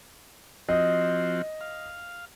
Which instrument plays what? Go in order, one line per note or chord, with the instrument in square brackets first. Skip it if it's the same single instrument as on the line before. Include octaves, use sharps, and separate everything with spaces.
[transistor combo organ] F3 C4 F#4 [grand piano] D#5
[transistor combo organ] F5